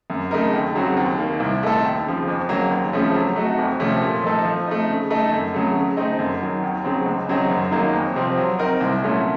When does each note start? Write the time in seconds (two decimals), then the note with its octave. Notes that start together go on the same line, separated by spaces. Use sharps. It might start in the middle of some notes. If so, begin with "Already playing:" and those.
0.10 F#2
0.31 C#3 A3 D#4 A#4
0.53 D#2
0.75 C#3 F#3 C4 F#4
0.97 D#2
1.18 D#3 A#3
1.40 C2
1.62 A#2 A3 D#4 A4
1.84 D#2
2.06 C#3 F3
2.28 F2
2.49 C#3 F#3 A#3
2.71 D#2
2.93 C#3 F3 A3 C#4
3.14 F#3
3.36 A3 D#4 F#4
3.58 F2
3.80 C3 F3 A3 C#4
4.02 A#2
4.24 F3 A3 D#4 A4
4.44 F3
4.67 A3 D#4
4.89 C#3
5.10 A3 D#4 A4
5.32 F#2
5.54 C#3 F#3 A3
5.75 C#3
5.97 A3 C4 D#4
6.19 F#2
6.41 D#3 F#3
6.62 D#2
6.84 C#3 F#3 C4
7.06 C#2
7.29 C#3 F#3 C4 D#4
7.50 F#2
7.71 D#3 F#3 A#3 D#4
7.93 F2
8.16 C3 F3 C4
8.37 F#3
8.59 C4 D#4 A#4
8.81 C2
9.02 A#2 F#3 A3 C#4